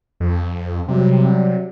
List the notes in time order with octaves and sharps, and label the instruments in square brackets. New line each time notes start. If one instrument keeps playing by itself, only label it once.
[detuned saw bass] F2
[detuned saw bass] C3 [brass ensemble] F#3 G3